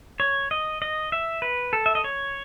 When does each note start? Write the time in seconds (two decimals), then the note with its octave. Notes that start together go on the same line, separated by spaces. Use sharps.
0.20 C#5
0.51 D#5
0.82 D#5
1.12 E5
1.42 B4
1.73 A4
1.86 E5
1.95 D#5
2.04 C#5